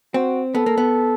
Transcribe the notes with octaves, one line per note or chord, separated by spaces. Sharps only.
C4 F#4
B3 A4
A#3
B3